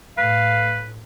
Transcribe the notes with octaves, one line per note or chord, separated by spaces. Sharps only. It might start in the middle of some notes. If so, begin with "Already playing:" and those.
A2 B4 F5